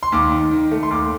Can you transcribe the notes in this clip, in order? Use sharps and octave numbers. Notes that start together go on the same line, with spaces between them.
C6
D#2 D6
D#3
D#3
A3
C6
D#2 D6